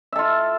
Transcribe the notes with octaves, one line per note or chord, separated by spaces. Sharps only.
F4 A4 E5